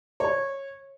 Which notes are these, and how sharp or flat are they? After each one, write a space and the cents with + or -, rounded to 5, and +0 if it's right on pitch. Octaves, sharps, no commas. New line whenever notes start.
C#5 -15